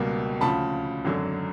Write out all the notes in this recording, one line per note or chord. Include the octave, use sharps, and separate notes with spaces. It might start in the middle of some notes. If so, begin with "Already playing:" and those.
Already playing: C#2 B2 G3 A#3
D2 C#3 F3 A5 B5
G#1 F#2 D3 F#3